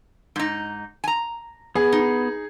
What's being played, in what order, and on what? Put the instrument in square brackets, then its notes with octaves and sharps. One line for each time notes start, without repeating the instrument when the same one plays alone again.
[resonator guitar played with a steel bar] G#2 D#4
G#5 A#5
[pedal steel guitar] B3 [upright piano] G#4
[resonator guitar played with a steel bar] D#4